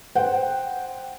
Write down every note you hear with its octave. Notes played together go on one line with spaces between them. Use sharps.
C5 F#5 G5